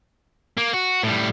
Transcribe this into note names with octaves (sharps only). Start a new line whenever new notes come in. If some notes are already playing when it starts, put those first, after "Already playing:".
A#3
F#4
A2 G3